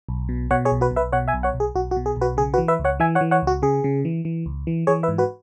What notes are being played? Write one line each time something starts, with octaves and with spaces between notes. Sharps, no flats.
B1
B2
B2 C#5 F#5
G#4 C#5
B1
F#4 B4
B1
B4 E5
B2 C#5 F#5
E5 G#5
B1
C#5 F#5
B1
G#4
B1 F#4
F#4
B2
G#4
B1
F#4 B4
C#3 G#4
F#4 B4
E3
B4 E5
C#2
C#5 F#5
E3 E5 G#5
C#5 F#5
E3
C#5 F#5
C#2 F#4
C#3 G#4
C#3
E3
E3
C#2
E3
E3 G#4 C#5
B4 E5
G#2
F#4 B4